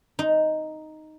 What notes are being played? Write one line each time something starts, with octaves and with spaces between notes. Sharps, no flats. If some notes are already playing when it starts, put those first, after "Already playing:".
D#4